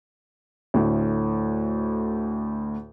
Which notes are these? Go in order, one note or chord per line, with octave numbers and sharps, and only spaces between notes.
D2 A2